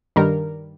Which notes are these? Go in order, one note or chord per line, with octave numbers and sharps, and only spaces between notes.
G2 D#3 G3 A#4